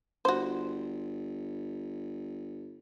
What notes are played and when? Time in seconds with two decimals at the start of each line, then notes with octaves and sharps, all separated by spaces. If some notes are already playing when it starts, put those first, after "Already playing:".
0.25 G1 F#4 C5